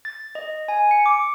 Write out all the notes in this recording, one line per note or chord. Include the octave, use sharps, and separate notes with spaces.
A6
D#5
G#5
C#7
D6